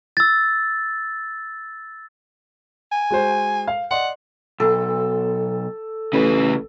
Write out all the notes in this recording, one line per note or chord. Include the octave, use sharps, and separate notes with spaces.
E6 A6
G#5
G#3 F#4 C5
F5
D5 D#5 F#5 C6
B1 A4
A1 C#3 B4